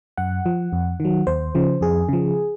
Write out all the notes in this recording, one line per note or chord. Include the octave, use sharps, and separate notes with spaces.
F#2 F#5
F3
F2
D#3
F#3
D#2 C5
C#3 F3
F2 G#4
C#3 F3